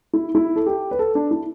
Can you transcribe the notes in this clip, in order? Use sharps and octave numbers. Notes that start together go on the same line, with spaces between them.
E4
E4
A4
G4
B4
A4
D4
E4